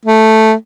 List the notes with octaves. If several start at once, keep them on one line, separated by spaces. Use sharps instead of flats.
A3